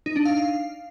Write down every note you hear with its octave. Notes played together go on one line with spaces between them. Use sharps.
D#4
D4
F5